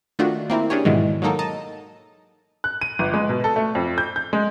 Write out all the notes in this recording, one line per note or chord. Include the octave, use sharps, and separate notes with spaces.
D#3 A3 D4 F4 F#4
A#3 C4 E4 A#4
C#4 D4 G4 G#4 C#5
G#2 B2 D#3 E3 F#3 G#3
F#3 G#3 A#3 D#4 A4 A#4
D#5 A5 A#5 D#6
F#6
D#7
G1
G#3
B2
A4
A3
F2
G6
G6
G#3